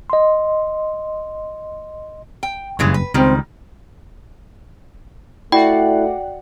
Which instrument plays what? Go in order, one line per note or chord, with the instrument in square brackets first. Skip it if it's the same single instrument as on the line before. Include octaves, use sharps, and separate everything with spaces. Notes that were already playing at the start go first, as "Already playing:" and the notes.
[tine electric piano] D#5 C6
[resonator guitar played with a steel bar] G5
[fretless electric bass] F#1 G2 [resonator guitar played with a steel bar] C#3 E3 G#3
[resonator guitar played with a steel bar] B4
[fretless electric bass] C#2 [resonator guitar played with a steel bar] D#3 G3 [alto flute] C4
[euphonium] A3 [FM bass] E4 [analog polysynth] F#4 D5 F#5 [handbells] G5